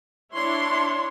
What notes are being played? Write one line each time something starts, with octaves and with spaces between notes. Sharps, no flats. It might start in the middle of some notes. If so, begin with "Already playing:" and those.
D4 E4 C#5 C6